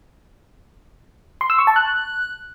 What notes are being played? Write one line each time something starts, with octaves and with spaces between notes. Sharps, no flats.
C6
E6
C#6
A5
F#6